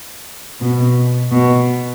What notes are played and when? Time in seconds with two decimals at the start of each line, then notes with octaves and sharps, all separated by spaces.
0.60 B2
1.31 B2